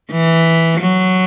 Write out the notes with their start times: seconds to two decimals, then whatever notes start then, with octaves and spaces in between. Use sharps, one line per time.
0.12 E3
0.81 F#3